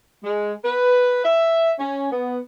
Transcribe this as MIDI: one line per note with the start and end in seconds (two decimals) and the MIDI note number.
0.24 0.53 56
0.64 1.22 71
1.24 1.72 76
1.79 2.07 61
2.12 2.39 59